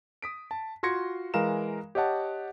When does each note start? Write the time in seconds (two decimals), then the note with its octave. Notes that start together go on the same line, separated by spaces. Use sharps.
0.22 D#6 B6 D7
0.51 A5
0.83 F4 F#4 C6 G#6 A#6 C#7
1.34 E3 G#3 A#4 F5 A#5 E7
1.95 G4 C#5 D#5 F#5 A5